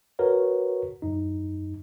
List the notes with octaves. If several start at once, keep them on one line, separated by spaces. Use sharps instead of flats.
F#4 A#4 B4 C#5
F#2 D#4